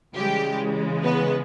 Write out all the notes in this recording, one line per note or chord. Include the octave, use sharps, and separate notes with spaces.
C#3 E3 G3 G#3 G4
B3 B4